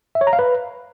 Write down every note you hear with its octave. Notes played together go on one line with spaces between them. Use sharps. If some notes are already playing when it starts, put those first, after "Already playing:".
E5
C#5
A#5
F5
B4